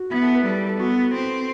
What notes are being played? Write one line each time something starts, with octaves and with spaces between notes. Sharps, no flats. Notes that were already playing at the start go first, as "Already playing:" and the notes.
Already playing: F#4
B3 E4
A4
B4
G3 A4
A4
A4
B3 F#4
C4